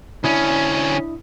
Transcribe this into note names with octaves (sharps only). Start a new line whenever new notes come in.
D2 C#4 D4 E4 D#6